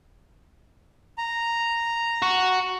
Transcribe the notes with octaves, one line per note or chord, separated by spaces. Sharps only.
A#5
F#4